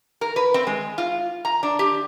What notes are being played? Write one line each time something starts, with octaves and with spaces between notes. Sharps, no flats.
A#4
B4
C4
G#3
F4
A#5
D4
G4